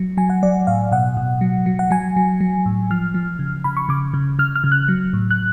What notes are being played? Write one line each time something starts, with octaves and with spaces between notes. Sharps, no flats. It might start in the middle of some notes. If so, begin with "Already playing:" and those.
Already playing: F#3
F#3 G#5
F#5
F#3 D5
A2 F5
B2 F#5
B2
F#3
F#3
F#5
F#3 G#5
F#3
F#3
A2
F3 F6
F3
C#3
C#3 B5
C#6
C#3 D6
C#3
C#3 F6
F6
C#3
F#6
F#3
A2
F#6